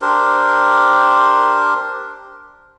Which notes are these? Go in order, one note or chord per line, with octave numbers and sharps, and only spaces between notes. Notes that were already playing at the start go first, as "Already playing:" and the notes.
D4 G4 A#4 C5